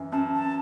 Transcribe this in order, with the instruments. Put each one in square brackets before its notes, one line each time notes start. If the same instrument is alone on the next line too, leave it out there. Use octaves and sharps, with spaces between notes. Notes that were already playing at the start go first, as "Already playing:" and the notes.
Already playing: [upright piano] F#2 E3
[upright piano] F#2 [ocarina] A5
[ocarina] A5